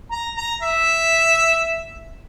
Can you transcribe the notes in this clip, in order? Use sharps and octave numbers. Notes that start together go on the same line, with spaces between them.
A#5
A#5
E5